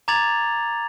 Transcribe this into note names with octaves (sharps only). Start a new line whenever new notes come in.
A#5 D6 G#6 A6 F7 F#7